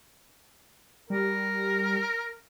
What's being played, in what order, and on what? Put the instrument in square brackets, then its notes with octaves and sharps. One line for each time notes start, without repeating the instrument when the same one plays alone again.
[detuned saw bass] G3 [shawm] A#4